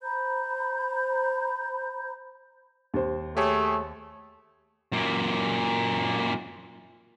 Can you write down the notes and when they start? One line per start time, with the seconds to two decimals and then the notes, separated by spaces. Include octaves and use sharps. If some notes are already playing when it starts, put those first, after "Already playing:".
0.02 C5 A#5 B5 G6
2.94 D#2 C5
3.37 A3 G4 G#4 C#5
4.92 F#2 A#2